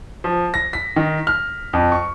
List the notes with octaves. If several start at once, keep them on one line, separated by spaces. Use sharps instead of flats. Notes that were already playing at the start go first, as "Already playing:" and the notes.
F3
A#6
B6
D#3
F6
F2
C#6